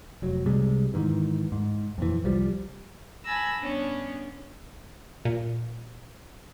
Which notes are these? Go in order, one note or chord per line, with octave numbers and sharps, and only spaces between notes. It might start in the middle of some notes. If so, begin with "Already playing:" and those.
F1 F#3
C2 C3 G3 G#3
G#2 D#3 E3
G#2
F2 A#2 E3
C2 F3 G3
G#5 A5 B5 E6 A#6
G2 B3 C#4 D4
A#2